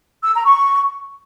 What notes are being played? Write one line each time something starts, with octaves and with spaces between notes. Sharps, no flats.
E6
A#5
C#6